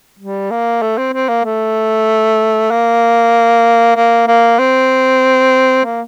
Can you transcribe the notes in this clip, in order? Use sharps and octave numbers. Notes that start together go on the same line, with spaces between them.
G3
A#3
A3
C4
C4
A#3
A3
A#3
A#3
A#3
C4
A#3